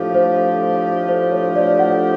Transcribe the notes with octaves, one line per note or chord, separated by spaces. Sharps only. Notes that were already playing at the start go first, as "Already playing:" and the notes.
Already playing: A2 F3 A3 D4 G4
C5
C5
C#5
D5
F#5